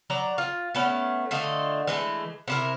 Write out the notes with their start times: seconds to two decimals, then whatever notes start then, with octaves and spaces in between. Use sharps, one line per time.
0.10 F#3 D5 A#5
0.38 F4
0.75 A3 B3 C#4
1.31 D3 A3 F4 D#5
1.87 E3 G#3 A3
2.48 C3 E4 A#4